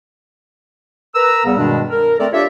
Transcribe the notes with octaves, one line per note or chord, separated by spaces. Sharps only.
A#4 B4 A#5 E6
E2 C#3 G3 B3
G2 B2 D#3 G3 G#3 D4
A#4
A3 C4 A4 A#4 D5
D4 F4 G4 C#5 D5 E5